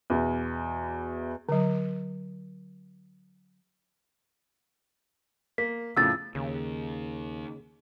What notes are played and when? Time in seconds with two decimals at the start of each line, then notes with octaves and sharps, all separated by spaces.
0.10 E2 B2 E3
1.49 D3 F#3
5.58 A#3 B6
5.97 F2 A2 C#3 E6 A6
6.35 D#2 C#3